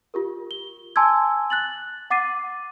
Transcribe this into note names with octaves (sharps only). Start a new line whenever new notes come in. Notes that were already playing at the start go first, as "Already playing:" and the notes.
F4 G4 A#4
G7
G#5 A5 C6 D6 E6 G#6
F#6 A6 F#7
F#5 D6 A6 C7 D#7